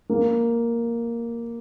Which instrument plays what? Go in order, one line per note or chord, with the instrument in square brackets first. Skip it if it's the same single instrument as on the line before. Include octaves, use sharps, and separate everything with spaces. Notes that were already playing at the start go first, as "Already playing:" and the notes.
[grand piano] A#3